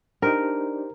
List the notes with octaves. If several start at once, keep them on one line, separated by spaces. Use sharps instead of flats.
D4 D#4 G4 A#4 C5